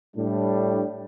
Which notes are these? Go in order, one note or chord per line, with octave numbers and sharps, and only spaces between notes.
A2 G3 D4